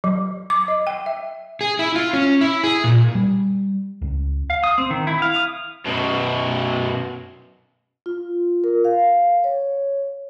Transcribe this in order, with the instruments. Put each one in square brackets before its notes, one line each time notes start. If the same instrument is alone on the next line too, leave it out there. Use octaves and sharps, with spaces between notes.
[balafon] F#3
D6
D#5
G5
E5
[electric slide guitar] G#4
E4
F4
C#4
E4
G#4
A#2
[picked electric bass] G3
C#2
[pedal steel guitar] F5
D#6
C4
D#3
E4
F5
D#6
[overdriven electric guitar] F#2 B2
[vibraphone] F4
A#4
F5
C#5